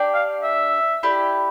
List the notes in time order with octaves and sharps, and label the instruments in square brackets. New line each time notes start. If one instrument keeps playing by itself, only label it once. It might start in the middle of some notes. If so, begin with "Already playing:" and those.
Already playing: [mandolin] D4 G4 D5
[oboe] F5
E5
[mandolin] E4 G4 D5